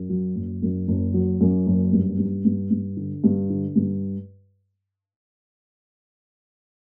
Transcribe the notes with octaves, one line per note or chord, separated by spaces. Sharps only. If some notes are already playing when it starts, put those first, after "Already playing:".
Already playing: F#2
F#3
F#1
F#2
F#1
F#3
F#2
F#1
G2
G2
G2
G2
D3
G2
D3
G2